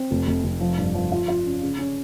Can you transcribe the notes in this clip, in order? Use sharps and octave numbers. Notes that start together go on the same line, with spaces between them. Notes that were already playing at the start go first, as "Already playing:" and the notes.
Already playing: C4
F1
F1
F1
F3
G2
F3
F4
F4
C#4
C#3
C#4